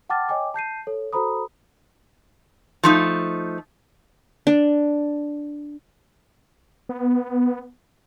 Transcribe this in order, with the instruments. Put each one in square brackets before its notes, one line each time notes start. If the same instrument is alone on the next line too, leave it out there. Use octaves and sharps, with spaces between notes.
[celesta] F#5 G5 A5 D6 F6 A6
C#5 D#5 G5 G#5 D6
A5 G6 C7 D#7
A4 C#5
F#4 A4 C5 A#5 B5 D#6
[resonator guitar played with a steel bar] F3 A3 D#4
[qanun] D4
[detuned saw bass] B3